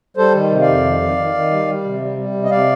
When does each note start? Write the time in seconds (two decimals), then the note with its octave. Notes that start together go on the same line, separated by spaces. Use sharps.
0.17 G3 A4 C5
0.34 D#3
0.50 C3
0.61 D5 F5
0.67 F2
0.85 D#3
1.01 D#3
1.17 D#3
1.34 D#3
1.51 G3
1.67 G3
1.84 C3
2.01 G3
2.17 G3
2.34 C3
2.44 D#5
2.51 C3 D5 F5